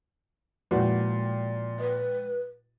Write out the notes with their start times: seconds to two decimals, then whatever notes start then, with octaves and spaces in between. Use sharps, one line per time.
0.71 A#2 F3 G#3 E4 F#4 B4 G5
1.79 B4 D#5